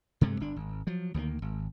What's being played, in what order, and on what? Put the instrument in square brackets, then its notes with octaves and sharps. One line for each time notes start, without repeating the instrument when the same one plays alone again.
[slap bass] G2 C3 G#3 A3
G1 D4
G#1
F3 F#3
D2 D#3 E3 A#3
G#1